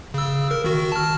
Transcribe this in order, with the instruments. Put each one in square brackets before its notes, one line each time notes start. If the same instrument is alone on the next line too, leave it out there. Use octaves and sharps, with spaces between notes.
[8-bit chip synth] C#3 E6
A#4
D#3 F#4
A5 F6